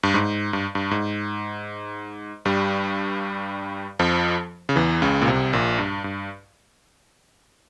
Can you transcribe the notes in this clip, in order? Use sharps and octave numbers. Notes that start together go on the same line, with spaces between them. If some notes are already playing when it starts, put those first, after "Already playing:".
G2
G#2
G2
G2
G#2
G2 G3
F2 F3
C#3
E2 E3
C#2 C#3
A#2
C2 C3
A#1 A#2
G2
G2